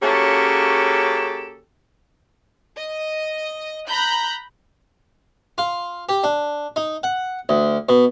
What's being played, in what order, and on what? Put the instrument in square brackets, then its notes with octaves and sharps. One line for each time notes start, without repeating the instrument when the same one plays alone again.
[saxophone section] C#3 A#3 C#4 F#4 G4 A4
[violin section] D#5
A#5 B5 F#6 G6
[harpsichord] F4
G4
D4
D#4
F#5
D2
B2